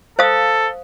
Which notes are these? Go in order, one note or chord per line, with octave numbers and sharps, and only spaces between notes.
A4 C5 F5 D#6